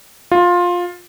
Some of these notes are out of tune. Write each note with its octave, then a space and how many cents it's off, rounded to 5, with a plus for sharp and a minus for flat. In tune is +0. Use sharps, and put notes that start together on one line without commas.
F4 +15